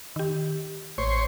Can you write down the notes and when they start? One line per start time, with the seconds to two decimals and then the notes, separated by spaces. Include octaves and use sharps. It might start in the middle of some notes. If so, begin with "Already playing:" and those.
0.16 D#3 G4
0.98 A1 C5 C#5